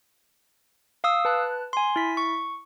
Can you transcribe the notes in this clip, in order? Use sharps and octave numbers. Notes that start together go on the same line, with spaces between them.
F5 D#6 E6
B4 A5 F#6
G#5 C6
E4 B6
C#6